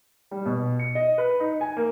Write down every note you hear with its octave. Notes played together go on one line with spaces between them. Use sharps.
G3
B2
C#7
D#5
B4
D#4
G#5
A#3